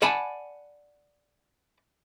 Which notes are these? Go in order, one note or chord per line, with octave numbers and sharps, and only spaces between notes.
D5 F#5 G#5 A5 B5